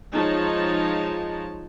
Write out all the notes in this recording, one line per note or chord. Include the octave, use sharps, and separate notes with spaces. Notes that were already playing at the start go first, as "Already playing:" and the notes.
F3 G#3 D#4 C#5 A5